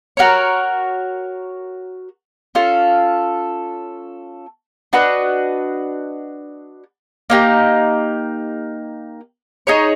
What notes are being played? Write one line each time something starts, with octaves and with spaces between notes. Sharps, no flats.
F#4 A#4 C#5
C#4 F4 A4
D4 F#4 B4 D#5
A#3 D#4 G4
D#4 G#4 C#5